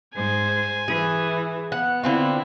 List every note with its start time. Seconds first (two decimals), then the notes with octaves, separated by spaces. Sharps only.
0.15 G#2 C5 G#5
0.88 E3 G#4
1.72 B3 F#5
2.04 D3 C4 E4 F4